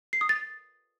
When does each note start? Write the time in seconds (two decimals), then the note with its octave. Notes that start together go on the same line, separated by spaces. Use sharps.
0.13 C7
0.21 D#6
0.29 A6